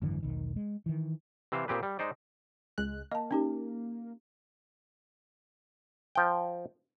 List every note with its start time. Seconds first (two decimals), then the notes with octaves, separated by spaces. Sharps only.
0.02 G#1 F#2 D3 E3
0.23 E1 B1 D#3
0.56 G#3
0.86 D#3 E3
1.52 C3 E3 C4 C5 F5
1.68 A#2 C4 G4 G#4 B4
1.83 G3
1.99 G#3 D#4 C5 D5
2.78 C#2 G#3 F#6
3.11 A#3 D#5 A5
3.31 C#4 D#4 G4
6.15 F3 G5